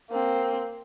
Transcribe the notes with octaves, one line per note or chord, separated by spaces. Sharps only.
A#3 C4